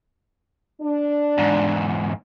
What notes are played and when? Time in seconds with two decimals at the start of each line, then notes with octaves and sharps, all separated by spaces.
0.82 D4
1.38 E2 G#2